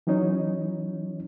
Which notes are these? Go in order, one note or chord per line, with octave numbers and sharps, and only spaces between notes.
E3 F#3 C#4 D#4 C#5